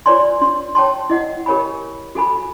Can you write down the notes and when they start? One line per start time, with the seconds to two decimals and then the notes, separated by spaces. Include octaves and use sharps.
0.06 F4 B4 C#5 D5 G#5 C6
0.41 D4 C6
0.75 C#5 G5 A5 C6
1.10 E4 D#5 F#5
1.46 G4 A#4 C#5 G#5 B5
2.15 F#4 A4 G#5 B5